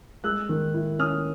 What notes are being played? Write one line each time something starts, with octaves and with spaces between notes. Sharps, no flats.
G#3 E6 F#6
D#3
E4
C#4 D#6 F6